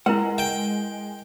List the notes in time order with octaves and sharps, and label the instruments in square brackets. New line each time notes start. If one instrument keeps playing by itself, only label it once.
[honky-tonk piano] G#3 [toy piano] E4 A#4 B4 [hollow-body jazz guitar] F#5
[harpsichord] G5